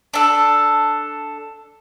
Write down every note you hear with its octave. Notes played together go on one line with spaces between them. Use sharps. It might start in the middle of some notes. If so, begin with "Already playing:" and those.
D4 A4